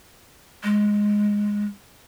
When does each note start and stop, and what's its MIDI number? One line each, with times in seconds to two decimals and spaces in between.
0.64 1.65 56